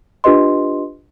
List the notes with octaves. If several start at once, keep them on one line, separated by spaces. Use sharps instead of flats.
D4 F4 G4 B4 D#5 C6